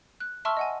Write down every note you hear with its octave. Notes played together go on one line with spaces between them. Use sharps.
F#6
E5 A5 C6 C#6 E6 F6
D#5 F#5 G#5